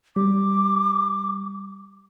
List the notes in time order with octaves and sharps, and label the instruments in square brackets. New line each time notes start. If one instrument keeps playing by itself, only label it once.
[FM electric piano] G3 [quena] D6